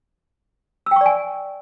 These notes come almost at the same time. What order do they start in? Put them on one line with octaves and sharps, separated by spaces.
E6 G5 C#6 D5 G#5